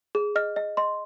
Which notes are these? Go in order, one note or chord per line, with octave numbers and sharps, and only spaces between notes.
G#4
D#5 F6
D#5
D#5 C6